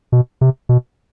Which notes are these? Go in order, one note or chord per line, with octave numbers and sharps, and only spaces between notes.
B2
C3
B2